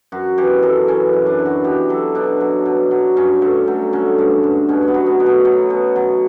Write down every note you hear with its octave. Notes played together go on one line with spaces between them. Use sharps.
F#2 F#4
E3 G4
F#2 A4
E3 C#4
F#2
D4
E3
F#4
B2 G4
F#3 A4
B2 D4
F#3
B2
F#3
G2 C#4
G2 A3
F#3 A3
D3 C#4
G2
G2
B2 C#4
C#4
B3
F#3
B3
B2
A3
F#3 A3
B2
F#3